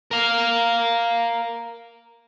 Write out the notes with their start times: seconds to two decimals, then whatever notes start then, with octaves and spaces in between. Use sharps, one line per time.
0.11 A#4 F5